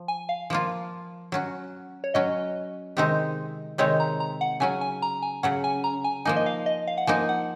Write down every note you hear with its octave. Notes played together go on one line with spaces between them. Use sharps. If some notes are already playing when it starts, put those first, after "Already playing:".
Already playing: F3
G#5
F5
F3 A#3 F4
F#3 C#4 F#4
C#5
F#3 C#4 F#4 D#5
C3 D#3 G#3 C4 D#4
C3 D#3 G#3 C4 D#4 C#5
A#5
A#5
F#5
C#3 F#3 C#4 G#5
G#5
A#5
G#5
C#3 F#3 C#4 F#5
G#5
A#5
G#5
F3 A#3 D#4 G#5
D#5
F5
D#5
F5
F#5
F3 A#3 D#4 G#5
F#5